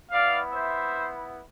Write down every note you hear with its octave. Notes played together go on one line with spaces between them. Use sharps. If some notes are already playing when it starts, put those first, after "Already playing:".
B3 E4 D5 F5
C5 E5